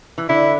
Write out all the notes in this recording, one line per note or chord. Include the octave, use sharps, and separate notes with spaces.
E3
D3 E4